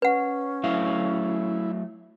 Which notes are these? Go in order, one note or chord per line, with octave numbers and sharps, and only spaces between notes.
C#4 B4 F#5
F#3 A3 E4 F5